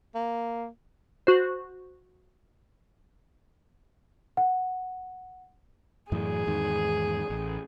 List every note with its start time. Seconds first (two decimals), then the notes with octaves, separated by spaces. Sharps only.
0.15 A#3
1.27 F#4 C5
4.37 F#5
6.12 F#2 A2 E3 G#4
6.47 E2 G#2 D#3
7.30 A1